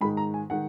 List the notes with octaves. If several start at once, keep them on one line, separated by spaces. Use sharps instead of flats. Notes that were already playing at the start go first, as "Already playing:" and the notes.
G#2 D#3 G#3 B5
A#5
G#5
D#3 G#3 F#5